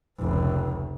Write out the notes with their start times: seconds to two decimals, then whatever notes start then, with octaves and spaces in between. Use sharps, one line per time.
0.19 F1 C#2